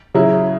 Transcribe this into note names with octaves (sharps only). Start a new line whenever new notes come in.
C#3 F#3 E4